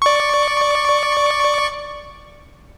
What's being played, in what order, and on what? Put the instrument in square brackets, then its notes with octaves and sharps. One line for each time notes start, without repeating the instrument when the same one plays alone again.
[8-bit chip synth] D5 C#6